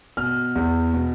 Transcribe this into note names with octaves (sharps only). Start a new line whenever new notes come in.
B2 F6
E2
B2